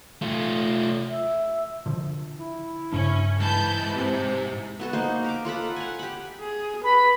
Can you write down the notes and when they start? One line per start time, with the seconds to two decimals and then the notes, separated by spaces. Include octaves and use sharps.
0.21 A3 F4
1.10 E5
1.86 D3 F3
2.37 E4
2.93 G2 C#3 C#4 D4
3.40 G#2 E3 A5 B5 G6
3.95 C3
4.80 B3 F#4 A4
4.93 A#3 D#4 C5
5.24 A#4 D6
5.45 F4 A4 F#5 B5
5.76 F#5 G#5
5.99 G4 B5
6.40 G#4
6.84 B4 B5